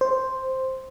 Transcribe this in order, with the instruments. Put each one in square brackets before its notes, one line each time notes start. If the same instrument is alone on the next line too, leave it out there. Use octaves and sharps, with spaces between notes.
[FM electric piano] C5